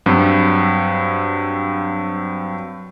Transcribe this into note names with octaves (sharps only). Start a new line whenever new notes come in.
G2 F#3 C4